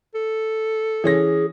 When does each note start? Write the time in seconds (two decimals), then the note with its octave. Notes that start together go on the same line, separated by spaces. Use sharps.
0.15 A4
1.04 E3 C#4 G#4 A#6